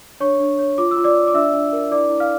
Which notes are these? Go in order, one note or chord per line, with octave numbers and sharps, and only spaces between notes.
D4 C#5 C#6
D4
C#5
F4 D6
E6
F4
D5 D6
D5
D6
D4 E5 E6
D4
A#4
E4 D5 D6
E4
F5 F6